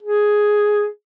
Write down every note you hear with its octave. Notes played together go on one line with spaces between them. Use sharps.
G#4